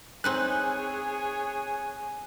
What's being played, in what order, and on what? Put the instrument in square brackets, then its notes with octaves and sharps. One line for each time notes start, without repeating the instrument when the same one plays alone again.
[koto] C4 D#4 B4 [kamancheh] G#4 C#5 [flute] G#5 [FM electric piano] F#6